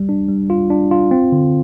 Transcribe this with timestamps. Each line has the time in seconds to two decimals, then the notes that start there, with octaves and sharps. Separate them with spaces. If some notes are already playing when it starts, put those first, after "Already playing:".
Already playing: G3
0.09 D4
0.29 G3
0.50 F4
0.70 D4
0.91 F4
1.11 C4
1.32 D3